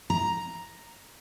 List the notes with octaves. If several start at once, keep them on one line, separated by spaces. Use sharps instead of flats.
A#5